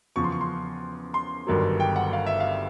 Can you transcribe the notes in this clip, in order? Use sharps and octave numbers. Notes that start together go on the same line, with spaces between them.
E2 C#3 F3 C#6
C6
C#6
C6
C6
G1 G2 D#3 F#3
G5
F#5
F5
E5
F5